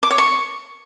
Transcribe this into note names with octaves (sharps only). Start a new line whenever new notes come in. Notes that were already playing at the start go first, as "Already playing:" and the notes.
D6
C#5
C#6